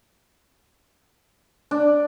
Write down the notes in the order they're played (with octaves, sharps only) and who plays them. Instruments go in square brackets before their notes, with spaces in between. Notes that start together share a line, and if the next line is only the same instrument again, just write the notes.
[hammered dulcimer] D4